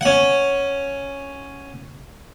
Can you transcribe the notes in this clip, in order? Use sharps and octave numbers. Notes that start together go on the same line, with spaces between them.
C#4 F#5